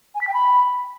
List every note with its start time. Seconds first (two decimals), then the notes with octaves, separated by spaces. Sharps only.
0.15 G#5
0.21 B6
0.28 G5
0.34 B5